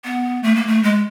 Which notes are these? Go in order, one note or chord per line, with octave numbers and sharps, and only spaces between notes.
B3
A3
A#3
A3
G#3